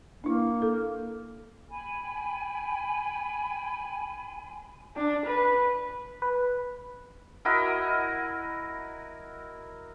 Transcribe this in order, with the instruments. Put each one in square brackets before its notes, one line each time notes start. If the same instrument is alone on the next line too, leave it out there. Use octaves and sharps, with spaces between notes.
[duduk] A#3 [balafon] D4 E4
[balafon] A4
[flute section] G5 G#5 B5
[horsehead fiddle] D4
B4
[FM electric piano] B4
[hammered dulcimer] E4 F#4 A#4 D#5